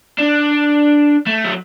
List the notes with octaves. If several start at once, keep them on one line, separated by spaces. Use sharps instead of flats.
D4
A3
F#3